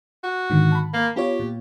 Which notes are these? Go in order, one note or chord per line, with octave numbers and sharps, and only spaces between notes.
F#4
G#2 D3 D#3
A5 B5
A#3
B3 F4 G4 C#5
A#2